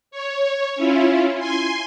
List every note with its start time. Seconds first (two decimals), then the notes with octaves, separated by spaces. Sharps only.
0.11 C#5
0.76 C#4 E4 F4
1.38 G#5 C6